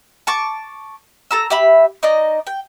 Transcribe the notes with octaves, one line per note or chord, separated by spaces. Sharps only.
A5 C#6 D6
A4 A#5 E6
G4 E5 B5
D#4 D5 D#5
G5